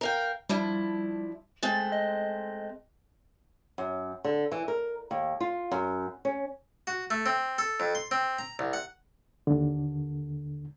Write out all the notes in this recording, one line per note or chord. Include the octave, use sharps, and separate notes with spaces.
A#4 F5 G5
F3 G3 D4 E4
G#3 A3 C4 A6
D#5
F#2
D3
E3
A#4
D#2
F4
F#2
C#4
F#4
A3
C4
A4
F2
C6
C4
A#5
C2
F#5
D#2 D3